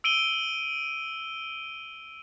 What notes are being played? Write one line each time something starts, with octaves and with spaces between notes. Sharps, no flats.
E6 D7 D#7 G7